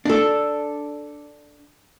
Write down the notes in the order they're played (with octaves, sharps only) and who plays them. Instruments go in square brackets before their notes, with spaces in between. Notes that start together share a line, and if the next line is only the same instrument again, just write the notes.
[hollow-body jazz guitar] D4 A4